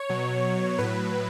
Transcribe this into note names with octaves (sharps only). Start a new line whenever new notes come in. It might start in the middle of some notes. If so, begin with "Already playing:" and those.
Already playing: C#5
B2 F#3
A2 F#3 B4